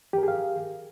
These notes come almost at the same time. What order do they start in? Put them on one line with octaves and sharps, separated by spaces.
G4 A#4 G#4 F5